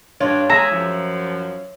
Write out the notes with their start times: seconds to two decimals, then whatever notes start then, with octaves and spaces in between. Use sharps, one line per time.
0.20 G2 D4 F4 C#5
0.49 G#3 G#4 E5 A#5
0.70 F#2 F3